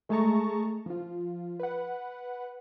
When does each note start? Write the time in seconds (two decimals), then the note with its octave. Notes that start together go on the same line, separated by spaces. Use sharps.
0.09 G#3 A3 G#4 A5 A#5 C#6
0.86 F3 F4
1.60 B4 F#5